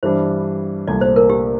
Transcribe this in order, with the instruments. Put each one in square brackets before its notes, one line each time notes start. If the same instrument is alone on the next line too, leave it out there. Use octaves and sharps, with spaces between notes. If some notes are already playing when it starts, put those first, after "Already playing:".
[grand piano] G2 E3 G3 D4 [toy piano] C5
[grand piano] C2 A#2 A3 [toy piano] D5
[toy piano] C5
A#4
G4